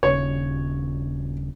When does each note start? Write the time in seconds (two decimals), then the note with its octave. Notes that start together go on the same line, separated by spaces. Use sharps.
0.03 D#1 C#3 C#5